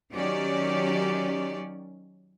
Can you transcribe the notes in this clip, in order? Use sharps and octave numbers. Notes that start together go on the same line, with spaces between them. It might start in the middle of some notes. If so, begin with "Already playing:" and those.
D#3 F#3 C#4 G4 D5